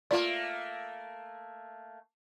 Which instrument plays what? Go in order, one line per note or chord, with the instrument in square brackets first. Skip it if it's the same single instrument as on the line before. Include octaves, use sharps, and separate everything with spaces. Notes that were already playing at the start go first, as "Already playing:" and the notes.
[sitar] A3 A#3 [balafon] F4 D5